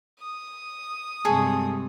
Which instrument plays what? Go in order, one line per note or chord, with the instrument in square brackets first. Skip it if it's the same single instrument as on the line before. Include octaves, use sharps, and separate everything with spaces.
[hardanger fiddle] D#6
[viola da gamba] G2 C3 G#3 [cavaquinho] G#4 A4 C#6